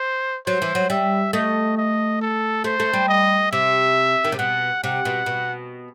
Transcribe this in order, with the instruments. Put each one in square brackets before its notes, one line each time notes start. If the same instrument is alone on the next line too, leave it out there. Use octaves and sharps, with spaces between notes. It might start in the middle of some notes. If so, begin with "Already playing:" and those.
Already playing: [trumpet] C5
[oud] F#3 [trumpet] C5
[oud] E3
F#3
[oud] G3 [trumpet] E5
[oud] A3 [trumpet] D#5
[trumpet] D#5
A4
[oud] A3 [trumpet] C5
[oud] A3
G3
[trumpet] D#5
[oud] C3 [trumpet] E5
[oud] D#3
C3
[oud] B2 [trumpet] F#5
[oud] C3 [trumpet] F#5
[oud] B2
B2